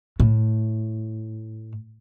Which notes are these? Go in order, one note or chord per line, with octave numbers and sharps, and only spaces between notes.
A2